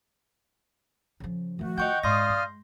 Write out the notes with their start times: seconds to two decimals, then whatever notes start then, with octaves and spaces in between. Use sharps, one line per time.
1.20 C#3 F3
1.59 D#3 F3 A3 F#4
1.78 D#3 F4 D#5 F#5 G5 C#6 G6
2.03 G#2 D5 F5 C6 D#6 G6 A#6
2.29 G#3